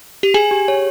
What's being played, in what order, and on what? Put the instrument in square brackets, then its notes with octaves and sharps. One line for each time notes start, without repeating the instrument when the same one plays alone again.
[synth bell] G4
[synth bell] G#4 [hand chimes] G#5
[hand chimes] G4
C#5